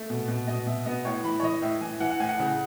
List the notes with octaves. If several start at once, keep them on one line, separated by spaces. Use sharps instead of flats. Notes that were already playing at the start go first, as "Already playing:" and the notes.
Already playing: A3
B2
B2
B2 D#5
B2 E5
B3 D#5
A2 C#5
E3 B5
C#5
E3 D#5
A2 E5
E3 G#5
E3 F#5
F#5
A2 G#5
F#5
C#3